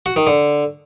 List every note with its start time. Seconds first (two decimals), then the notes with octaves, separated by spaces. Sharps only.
0.06 F#4
0.16 D#3
0.27 D3